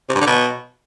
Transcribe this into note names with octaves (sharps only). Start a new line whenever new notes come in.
C3
G2
D3
B2